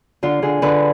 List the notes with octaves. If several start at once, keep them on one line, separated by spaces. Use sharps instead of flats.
D3 F4
D3 G#4
D3 B4